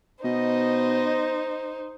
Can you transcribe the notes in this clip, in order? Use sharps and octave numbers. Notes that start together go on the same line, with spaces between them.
B2 D#4 C5 D#5